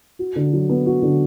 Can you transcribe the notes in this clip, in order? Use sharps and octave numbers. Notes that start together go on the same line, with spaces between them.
F#4
D3
F#3
B3
F#4
D3